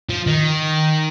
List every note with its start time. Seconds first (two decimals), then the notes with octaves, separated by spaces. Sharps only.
0.09 F3
0.27 D#3